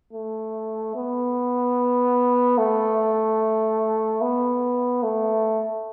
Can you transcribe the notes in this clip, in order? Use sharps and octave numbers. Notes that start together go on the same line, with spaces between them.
A3
B3
A3
B3
A3